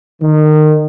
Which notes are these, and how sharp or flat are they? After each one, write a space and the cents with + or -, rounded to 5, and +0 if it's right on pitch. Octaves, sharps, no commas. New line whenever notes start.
D#3 -25